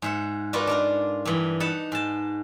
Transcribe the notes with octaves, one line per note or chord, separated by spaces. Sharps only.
G#2 E5 F#5
D#4 F4 F#4 A#4 B4 D5
D4 F4 A#4
G2 E3
D#4 F#5 A5 B5
G#2 A5